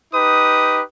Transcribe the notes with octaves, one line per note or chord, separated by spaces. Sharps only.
D#4 G4 B4 D#6